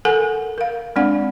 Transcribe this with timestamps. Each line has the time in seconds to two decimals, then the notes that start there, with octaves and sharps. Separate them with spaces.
0.05 A4 A#4 F#5 G#5
0.58 A#4 F5
0.96 G#3 C4 D4 D5 F#5